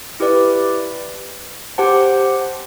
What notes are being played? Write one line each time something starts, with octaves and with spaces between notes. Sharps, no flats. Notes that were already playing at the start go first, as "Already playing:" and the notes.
E4 G4 B4 D5
G4 C5 F#5 A5